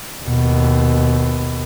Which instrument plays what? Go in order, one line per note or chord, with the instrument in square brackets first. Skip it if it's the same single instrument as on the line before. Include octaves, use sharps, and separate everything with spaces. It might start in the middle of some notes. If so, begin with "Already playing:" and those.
[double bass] D#2 B2